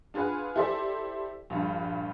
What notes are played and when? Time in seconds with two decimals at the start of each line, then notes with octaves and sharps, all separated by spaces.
0.14 D4 F4 G#4 B4 F#5
0.56 E4 G4 A4 C5 D5 E5
1.50 A#1 G2